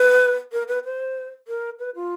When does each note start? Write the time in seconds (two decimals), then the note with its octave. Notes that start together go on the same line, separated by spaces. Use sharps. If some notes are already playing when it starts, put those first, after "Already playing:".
Already playing: B4
0.52 A#4
0.68 B4
0.84 C5
1.48 A#4
1.79 B4
1.95 F4